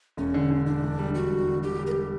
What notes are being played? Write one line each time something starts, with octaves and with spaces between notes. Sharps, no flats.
E1 C#4
D3
D3
D3 D4
E1
G3
E1 F#4
G3
D3
D3 G4
G3
A#4
G4